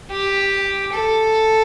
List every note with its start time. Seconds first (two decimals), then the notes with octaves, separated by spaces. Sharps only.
0.11 G4
0.93 A4